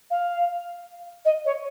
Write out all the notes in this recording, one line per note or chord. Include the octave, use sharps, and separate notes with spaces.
F5
D#5
C#5